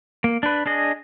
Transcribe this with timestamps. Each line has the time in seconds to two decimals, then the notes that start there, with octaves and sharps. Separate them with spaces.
0.24 A#3
0.43 D4 B4
0.66 D4 G#4 D#5